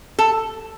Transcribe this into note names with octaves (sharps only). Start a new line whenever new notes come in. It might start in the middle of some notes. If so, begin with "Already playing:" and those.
A4